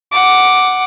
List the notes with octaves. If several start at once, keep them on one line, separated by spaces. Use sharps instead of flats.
F#5 D6